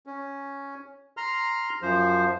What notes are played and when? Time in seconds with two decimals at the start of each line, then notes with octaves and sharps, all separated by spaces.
0.06 C#4
1.17 A#5 C6 F6
1.82 F#2 F3 C5